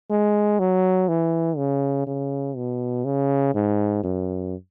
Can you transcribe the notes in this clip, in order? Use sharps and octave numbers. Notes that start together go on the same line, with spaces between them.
G#3
F#3
E3
C#3
C#3
B2
C#3
G#2
F#2